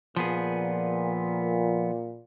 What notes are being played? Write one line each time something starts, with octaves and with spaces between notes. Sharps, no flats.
A#2 F3 B3 G#4